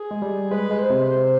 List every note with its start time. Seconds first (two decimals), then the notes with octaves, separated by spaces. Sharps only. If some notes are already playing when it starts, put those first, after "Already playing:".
Already playing: G#4
0.11 G#3
0.22 G3
0.51 G#3 B4
0.71 G#3
0.81 C5
0.90 C3
1.09 C5